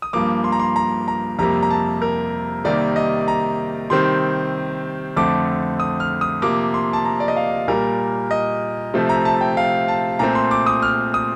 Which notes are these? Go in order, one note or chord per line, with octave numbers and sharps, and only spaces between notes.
D#6
G2 F3 A#3 D6
C6
A#5
C6
A#5
A#5
F2 C3 G3 A#3 A#5
A#5
A5
A#4
C3 D#3 G3 A#3 D5
D#5
A#5
C3 D#3 G3 C4 C6
F2 D3 A3 C4 D6
D#6
F6
D#6
C3 F3 A#3 D6
C6
A5
A#5
D5
D#5
F5
A#2 G3 A#3 A#4
D#5
C3 F3 A3 C4
A#5
A5
G5
F5
A5
A#2 A3 C4 A#5
C6
D6
D#6
F6
D#6